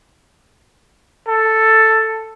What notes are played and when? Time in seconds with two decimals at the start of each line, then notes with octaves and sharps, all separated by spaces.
1.28 A4